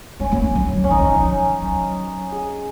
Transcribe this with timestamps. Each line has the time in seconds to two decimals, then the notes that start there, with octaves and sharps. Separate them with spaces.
0.20 G#3 C#4
0.32 A#3
0.43 A#3
0.55 F#3
0.73 D#3
0.84 C#4
0.90 D#3 D#4
1.03 D#3
1.14 F3
1.61 F#3
2.32 G#4